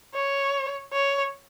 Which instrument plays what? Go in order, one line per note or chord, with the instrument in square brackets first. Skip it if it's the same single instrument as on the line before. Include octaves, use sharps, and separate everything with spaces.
[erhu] C#5
C#5